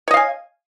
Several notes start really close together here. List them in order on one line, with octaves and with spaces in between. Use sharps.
C#5 D#5 F5 G#5